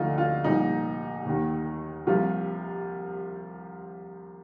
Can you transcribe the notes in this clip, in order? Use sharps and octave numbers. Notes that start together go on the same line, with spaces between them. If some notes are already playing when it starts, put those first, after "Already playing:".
Already playing: D2 D3 F3 D#4 F4
F4
C2 A#2 F3 D#4
D#2 D#3
C2 C3 F3 F4